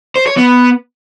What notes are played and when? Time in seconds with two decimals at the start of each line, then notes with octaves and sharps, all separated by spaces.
0.16 C5
0.26 C#5
0.37 B3